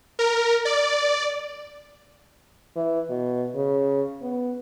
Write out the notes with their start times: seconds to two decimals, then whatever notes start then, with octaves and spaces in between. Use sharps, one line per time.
0.19 A#4
0.65 D5
2.76 E3
3.10 B2
3.54 C#3
4.22 B3